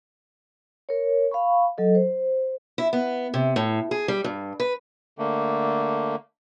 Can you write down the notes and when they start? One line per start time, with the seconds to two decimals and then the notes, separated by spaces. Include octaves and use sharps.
0.89 A#4 C#5
1.31 F5 B5 C#6
1.78 F#3 A4 D#5
1.95 C5
2.78 E4
2.93 B3
3.34 C3
3.56 A2
3.91 G#4
4.08 G3
4.24 G2
4.60 B4
5.18 D3 A3 A#3